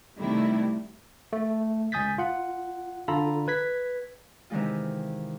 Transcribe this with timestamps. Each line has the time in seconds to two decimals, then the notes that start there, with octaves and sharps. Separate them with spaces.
0.19 C3 D#3 G3 A3 E4
1.33 A3
1.92 C#2 G#5 D#6 G6 A6 B6
2.18 F4 F#5
3.08 D3 F4 A4 A#5 B5
3.48 B4 G#6 B6
4.50 C3 D#3 E3 G#3 F4